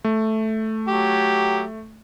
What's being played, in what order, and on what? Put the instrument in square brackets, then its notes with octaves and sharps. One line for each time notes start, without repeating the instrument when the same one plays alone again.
[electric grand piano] A3
[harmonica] F#3 G4